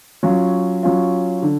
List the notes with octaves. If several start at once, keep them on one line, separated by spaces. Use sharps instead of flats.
F#3 C#4 F4
F#3 C#4 F4
D3